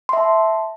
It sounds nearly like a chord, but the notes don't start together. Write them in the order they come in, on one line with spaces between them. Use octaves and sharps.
C6 E5 A5